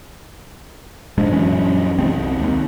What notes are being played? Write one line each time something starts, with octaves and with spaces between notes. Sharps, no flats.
A#1 G#2 G#3 D4
A#1 F#2 E3 C#4
C2 G#3 C4
D#2